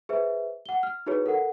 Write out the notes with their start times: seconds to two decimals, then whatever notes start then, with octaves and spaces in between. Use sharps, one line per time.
0.09 G#4 B4 C5 E5
0.66 F#5 G7
0.83 F6
1.06 D#4 E4 F#4 G#4 B4 C#5
1.26 A4 A#4 F#5